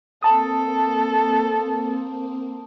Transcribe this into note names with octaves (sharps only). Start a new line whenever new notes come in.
A#3 C4 A4 A5 D#6